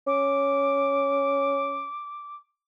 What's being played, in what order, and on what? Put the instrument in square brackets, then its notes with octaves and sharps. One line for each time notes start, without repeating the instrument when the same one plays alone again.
[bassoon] C#4 [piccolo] D6